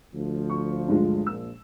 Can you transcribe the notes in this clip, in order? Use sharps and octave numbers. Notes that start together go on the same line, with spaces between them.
D2 F3
C#6
G2 G#3 F4
A#1 A#2 F3 E6